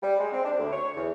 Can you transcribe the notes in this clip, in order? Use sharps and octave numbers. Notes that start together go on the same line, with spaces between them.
G3
G#3
C4
D4
D2
C#5
E2